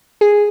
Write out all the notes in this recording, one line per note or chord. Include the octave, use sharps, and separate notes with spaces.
G#4